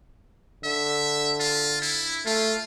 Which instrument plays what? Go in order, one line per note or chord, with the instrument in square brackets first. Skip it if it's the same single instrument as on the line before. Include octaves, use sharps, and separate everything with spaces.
[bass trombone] D3 [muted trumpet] E5
[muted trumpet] F4
E4
[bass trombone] A3 [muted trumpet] F4